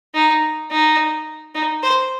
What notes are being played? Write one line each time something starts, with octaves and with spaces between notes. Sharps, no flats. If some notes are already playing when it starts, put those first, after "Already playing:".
D#4
D#4
D#4
C5